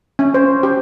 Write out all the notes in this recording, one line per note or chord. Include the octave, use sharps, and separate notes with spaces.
C#4
C5
G4